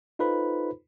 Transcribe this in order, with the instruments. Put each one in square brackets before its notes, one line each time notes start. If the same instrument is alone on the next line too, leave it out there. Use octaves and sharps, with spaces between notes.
[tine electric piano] D#4 F4 A4 B4 C5 B5